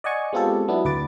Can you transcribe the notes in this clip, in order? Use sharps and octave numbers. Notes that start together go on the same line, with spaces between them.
D5 D#5 F#5 G#5 C#6
G#3 B3 C4 F4 G4 A4
F#3 B3 D4 E4
D2 B4 D6 A6